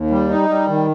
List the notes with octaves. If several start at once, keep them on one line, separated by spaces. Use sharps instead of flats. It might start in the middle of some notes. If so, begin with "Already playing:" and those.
Already playing: D#2
G3
D#4
G3
D#3